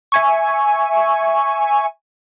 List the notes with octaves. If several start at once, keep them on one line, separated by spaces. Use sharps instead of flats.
E5 G#5 C#6